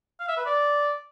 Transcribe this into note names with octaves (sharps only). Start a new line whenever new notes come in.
F5
E5
B4
D5